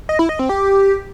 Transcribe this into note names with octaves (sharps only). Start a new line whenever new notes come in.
D#5
E4
D#5
C4
G4